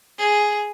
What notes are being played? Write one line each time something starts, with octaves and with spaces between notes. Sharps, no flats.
G#4